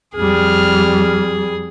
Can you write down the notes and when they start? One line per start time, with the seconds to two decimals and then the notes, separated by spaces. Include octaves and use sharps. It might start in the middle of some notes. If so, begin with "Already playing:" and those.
0.16 F2 G3 G#4 F6